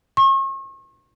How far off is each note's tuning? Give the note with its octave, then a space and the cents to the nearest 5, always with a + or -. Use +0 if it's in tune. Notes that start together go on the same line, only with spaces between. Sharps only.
C#6 -40